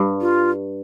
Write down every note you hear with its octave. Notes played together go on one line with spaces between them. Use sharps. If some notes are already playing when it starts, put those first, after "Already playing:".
Already playing: G2
F4